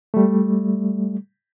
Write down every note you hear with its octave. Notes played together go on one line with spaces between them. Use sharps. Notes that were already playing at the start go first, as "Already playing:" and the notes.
G3 A3